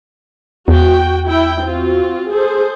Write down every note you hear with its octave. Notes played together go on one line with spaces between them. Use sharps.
E2 F#4 G5
E4 G5
C4 F4 F#4
G#4 A4 C5